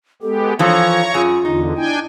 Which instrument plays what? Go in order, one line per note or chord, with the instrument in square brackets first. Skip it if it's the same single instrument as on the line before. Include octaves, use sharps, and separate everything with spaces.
[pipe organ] G#3 B3 G4 [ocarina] A4
[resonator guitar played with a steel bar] E3 F3 A4 [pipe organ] C#5 A#5 C#6 [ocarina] F5
[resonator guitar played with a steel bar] F#2 G#4 [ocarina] F4
[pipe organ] E2 D3 [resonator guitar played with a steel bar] D#4
[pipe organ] D4 G5 G#5 [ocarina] E4